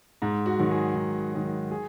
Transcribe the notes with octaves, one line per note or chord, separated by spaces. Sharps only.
G#2
F#4
D#3 F#3
G#4
G#2
D#3 F#3
G#4